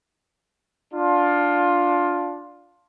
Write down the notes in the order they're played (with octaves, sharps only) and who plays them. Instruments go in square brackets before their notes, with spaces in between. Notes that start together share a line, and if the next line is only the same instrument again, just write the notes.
[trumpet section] D4 F4